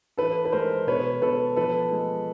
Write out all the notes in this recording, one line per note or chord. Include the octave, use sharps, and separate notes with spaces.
E3 A4 B4
B4
G#3 A#4 C5
B2 B4 C#5
B2 A4 B4
F3 A4 B4
G#3